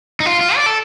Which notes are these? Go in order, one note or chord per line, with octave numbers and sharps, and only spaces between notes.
D#4
F4
F4
D5
A4